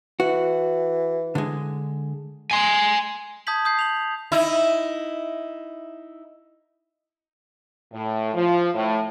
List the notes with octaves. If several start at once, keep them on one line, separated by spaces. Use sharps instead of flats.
E3 F#4
D3 G#3
G#5 C6
A5 D#6 G6 G#6 B6 F#7
D#6 G6 C7
F7 F#7
D#4 E4
A2
F3
A2